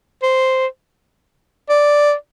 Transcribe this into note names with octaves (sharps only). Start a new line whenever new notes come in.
C5
D5